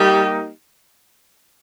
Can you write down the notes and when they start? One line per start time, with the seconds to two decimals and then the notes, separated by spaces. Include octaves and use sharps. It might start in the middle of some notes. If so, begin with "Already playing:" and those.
Already playing: G3 A#3 D#4 G4